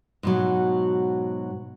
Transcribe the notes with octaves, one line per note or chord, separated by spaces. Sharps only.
G#2 B2 F#3